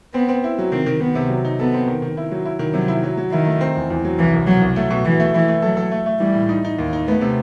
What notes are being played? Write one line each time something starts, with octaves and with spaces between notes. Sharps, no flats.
B3 C4
C4
E4
F#3
D#3 C4
D#3
D#3 B3
C3
F#3
D#4
B3 A4
C4
D#3
D#3
E4
F#3
E4
D#3
C3 F#3
E4
F#3
F#3
D#3 E4
A3
C4
E2
E2
F#3
C2 E3
C2
B2 F#3
C2
F#3 A3
B2
B2 E3
A3
E3 E4
A3
F#3 A4
A4
A3
A3
E3 G3
A2
D#4
D#4
D#2
D#4
A3 B3
C3